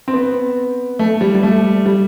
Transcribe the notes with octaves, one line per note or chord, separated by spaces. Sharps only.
C4
B3
A3
G3
G3
A3
G3